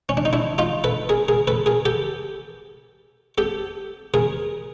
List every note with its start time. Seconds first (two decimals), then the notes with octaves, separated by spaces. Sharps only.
0.09 C#4
0.17 D4
0.25 D#4
0.33 D4 E4
0.58 D#4 F4
0.84 A4 B4
1.09 G#4 A#4
1.28 G#4 A#4
1.47 A4 B4
1.66 G#4 A#4
1.85 G4 A4
3.38 G4 A4
4.14 G#4 A#4